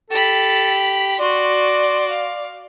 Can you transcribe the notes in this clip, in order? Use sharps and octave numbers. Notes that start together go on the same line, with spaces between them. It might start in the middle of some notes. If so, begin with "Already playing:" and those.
G4 A4 B5
F#4 D5 C6
F5